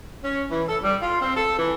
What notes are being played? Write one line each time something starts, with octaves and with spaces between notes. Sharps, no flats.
C#4
E3
A4
G3
F4
C4
A4
E3